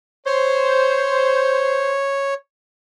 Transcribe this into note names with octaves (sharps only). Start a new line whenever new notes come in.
C5 C#5